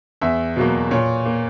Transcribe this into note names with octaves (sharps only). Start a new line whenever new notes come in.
E2 E5
B2 F#3 A#3
A#2 C#5
A#3